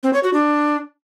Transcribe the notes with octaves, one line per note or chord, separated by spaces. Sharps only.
C4
C#5
F#4
D4